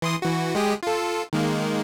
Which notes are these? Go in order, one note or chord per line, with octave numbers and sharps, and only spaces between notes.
E3 C6 D#6
E3 F#4
G#3 G4 G#4
F4 A4
D#3 G#3 A#3